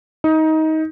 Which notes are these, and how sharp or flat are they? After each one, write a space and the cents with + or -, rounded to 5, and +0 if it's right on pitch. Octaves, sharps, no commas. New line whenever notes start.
D#4 +20